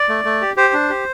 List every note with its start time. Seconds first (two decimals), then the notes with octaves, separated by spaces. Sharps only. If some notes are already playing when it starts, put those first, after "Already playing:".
Already playing: D5
0.09 A3
0.25 A3
0.41 G4
0.56 G4 C5
0.73 D4
0.89 G4